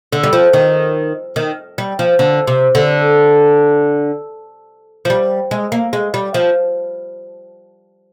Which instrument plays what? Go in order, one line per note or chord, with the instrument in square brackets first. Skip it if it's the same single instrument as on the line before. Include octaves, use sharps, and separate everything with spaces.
[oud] D3
G3
F3
D#3
D#3
G3
F3
D3
C3
D3
F3
G3
G#3
A#3
G#3
G3
F3